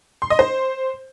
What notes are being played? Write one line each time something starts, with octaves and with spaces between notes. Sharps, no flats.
C6
D#5
C5